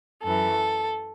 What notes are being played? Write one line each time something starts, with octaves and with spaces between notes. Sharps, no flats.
F#2 E3 A4